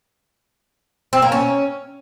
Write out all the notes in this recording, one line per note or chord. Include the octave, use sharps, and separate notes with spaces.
C4
A#3
C#4